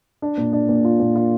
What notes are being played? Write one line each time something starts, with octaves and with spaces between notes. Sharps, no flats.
D4
A#2
D4
A#2
F4
A#2
F4